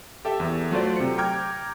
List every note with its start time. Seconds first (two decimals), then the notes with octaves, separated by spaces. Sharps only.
0.25 G4 A4 E5
0.40 E2
0.71 F#3 A3 F4 C5 D5
0.96 C3 C#7
1.18 G5 A#5 D6 F6 G6 G#6